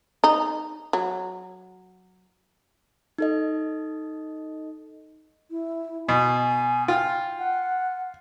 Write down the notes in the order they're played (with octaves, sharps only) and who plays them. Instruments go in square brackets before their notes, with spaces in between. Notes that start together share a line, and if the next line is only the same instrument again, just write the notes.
[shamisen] D#4
F#3
[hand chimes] D#4 A4 D#5
[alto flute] E4
[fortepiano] B2 [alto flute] G#5
[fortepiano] F4 [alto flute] G5
[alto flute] F#5